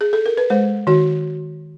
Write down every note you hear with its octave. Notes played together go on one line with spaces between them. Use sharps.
G#4
A4
A#4
B4
G#3 C5
D#3 F#4